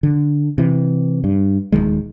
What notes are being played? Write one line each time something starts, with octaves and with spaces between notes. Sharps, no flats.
D3
C3 E3
G2
D#1 D#2 D#3 G#3